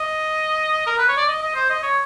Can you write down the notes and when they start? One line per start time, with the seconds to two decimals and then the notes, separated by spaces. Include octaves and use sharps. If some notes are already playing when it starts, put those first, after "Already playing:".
Already playing: D#5
0.86 A#4
0.98 B4
1.08 C#5
1.17 D5
1.28 D#5
1.42 D#5
1.55 C5
1.70 D#5
1.82 C#5